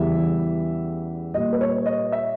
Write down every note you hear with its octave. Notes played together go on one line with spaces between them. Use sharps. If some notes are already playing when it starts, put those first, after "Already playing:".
Already playing: E2 C#3 E3 G3 E5
A#2 G3 D#5
B4
C#5
D#5
E5